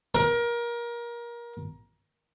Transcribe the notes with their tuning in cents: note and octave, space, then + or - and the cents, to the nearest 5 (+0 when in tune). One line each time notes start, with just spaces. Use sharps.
A#4 +25